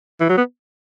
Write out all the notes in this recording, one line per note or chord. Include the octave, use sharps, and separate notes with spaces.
E3
F#3
B3